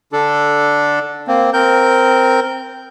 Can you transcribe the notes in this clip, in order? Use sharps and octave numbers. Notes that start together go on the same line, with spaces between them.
D3 D4 A4
A#3 C4
C4 A#4 G6